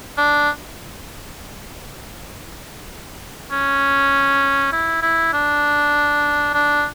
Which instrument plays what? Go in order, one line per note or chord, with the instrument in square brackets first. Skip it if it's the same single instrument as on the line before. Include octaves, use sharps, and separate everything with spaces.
[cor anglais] D4
C#4
E4
E4
D4
D4